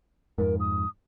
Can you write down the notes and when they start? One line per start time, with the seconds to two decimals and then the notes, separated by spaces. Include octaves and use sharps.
0.38 F2 G#2 A#4
0.60 D#6